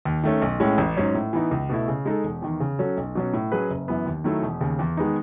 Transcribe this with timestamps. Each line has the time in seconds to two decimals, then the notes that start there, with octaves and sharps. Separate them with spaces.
0.05 D#2
0.23 D#3 A3 C#4
0.42 B1
0.60 A2 G#3 C#4
0.78 A1
0.97 G#2 F#3 C#4
1.14 A2
1.33 E3 B3 D#4
1.51 C#2
1.69 B2 A3 E4
1.88 C#3
2.05 G#3 D#4 A4
2.24 E1
2.42 E2 D#3
2.60 C#3
2.79 F#3 C#4 F#4 A4
2.97 B1
3.15 B2 F#3 C#4
3.33 A2
3.52 F#3 C#4 G#4 B4
3.70 F#1
3.88 F#2 E3 B3
4.06 D#2
4.24 D#3 F#3 A3 E4
4.42 E1
4.61 D#2 C#3
4.79 E2
4.97 D#3 G#3 B3 D#4